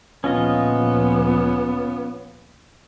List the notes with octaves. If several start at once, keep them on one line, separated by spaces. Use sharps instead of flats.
D2 A#2 F3 B3 C#4 F4 D#5